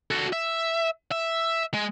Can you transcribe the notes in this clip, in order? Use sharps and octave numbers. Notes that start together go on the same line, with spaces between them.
F#4 A4
E5
E5
G#3